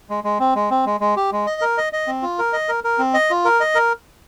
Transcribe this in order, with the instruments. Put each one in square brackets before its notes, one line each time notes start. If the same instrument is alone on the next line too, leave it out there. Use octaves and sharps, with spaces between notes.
[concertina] G#3
G#3
C4
G#3
C4
G#3
G#3
G4
G#3
D#5
A#4
D#5
D#5
C4
F4
A#4
D#5
A#4
A#4
C4
D#5
F4
A#4
D#5
A#4